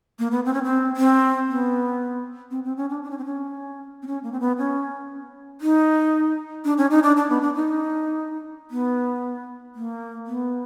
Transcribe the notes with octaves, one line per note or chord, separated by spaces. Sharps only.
A#3
B3
C4
C#4
C4
C4
B3
C4
C4
C#4
D4
D4
C#4
C4
C#4
C4
C#4
A#3
C4
B3
C#4
D#4
D4
C#4
D#4
D4
D4
B3
D4
D#4
B3
A#3
B3